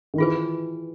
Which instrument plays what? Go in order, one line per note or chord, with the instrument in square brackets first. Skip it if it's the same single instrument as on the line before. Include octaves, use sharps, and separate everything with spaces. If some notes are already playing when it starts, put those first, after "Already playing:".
[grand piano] D#3
[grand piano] E3 [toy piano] F4 G#4 B4